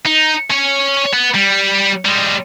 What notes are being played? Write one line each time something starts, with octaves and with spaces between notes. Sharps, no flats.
D#4
C#4 C#5
B3
G3
G3 G#3